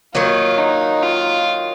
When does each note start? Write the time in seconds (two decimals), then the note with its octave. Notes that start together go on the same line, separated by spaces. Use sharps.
0.14 D#3 F#3 A#3 F4
0.58 D#4
1.03 F4